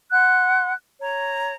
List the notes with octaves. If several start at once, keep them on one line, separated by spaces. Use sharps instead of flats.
F#5 C6 F#6
C#5 A#5